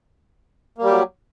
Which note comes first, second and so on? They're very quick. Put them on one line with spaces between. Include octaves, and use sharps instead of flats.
A#3 G3 G4 F#3